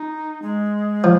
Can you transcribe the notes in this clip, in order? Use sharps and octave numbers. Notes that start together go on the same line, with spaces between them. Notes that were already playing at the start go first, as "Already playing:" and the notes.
Already playing: D#4
G#3
F3